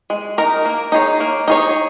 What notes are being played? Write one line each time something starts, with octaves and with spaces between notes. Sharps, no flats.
G#3
D#4 A#4
A#3
D#4 G#4 C#5
A#3
D#4 G#4 C#5